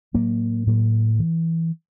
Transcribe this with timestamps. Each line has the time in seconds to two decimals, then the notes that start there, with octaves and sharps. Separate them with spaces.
0.14 A2 F#3 A#3
0.67 A2 F#3 A#3
1.19 E3